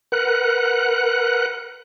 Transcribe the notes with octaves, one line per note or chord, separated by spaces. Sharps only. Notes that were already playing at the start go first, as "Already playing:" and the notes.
A#4 B4 F#5 F#6